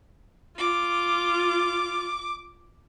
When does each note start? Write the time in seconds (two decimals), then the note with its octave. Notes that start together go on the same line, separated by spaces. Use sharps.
0.59 F4 D6